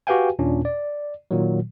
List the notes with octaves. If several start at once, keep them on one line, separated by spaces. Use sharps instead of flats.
F#4 G4 B4 F5 G5 G#5
D#2 A#2 C#4 D4
D5
A#2 D#3 F#3